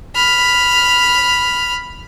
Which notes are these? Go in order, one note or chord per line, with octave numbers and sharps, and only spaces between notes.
B5 F6